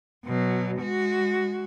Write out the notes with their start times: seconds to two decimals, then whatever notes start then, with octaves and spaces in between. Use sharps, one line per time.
0.25 B2 F#3
0.80 G#3 F#4